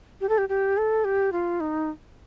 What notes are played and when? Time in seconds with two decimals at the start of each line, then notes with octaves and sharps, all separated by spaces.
0.21 G4
0.29 A4
0.38 G4
0.49 G4
0.77 A4
1.04 G4
1.32 F4
1.60 D#4